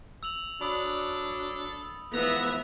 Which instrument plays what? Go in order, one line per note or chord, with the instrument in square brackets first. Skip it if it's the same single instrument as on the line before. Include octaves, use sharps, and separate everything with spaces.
[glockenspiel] E6 F7 F#7
[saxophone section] F#3 D4 [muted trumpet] A4 [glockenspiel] B5 D#6 F#7
[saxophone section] G#2 E3 F3 [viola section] B3 E5 [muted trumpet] A#5 [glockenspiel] F#6 F7